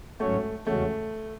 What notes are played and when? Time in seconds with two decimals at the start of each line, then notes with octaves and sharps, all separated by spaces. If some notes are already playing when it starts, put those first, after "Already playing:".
0.20 G#2 F#3 A3 C#4 F#4 C#5
0.67 E2 C#3 G#3 A3 C#4 F#4